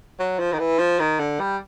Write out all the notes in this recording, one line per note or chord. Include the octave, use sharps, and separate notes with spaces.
F#3
F3
D#3
E3
F3
D#3
D3
G3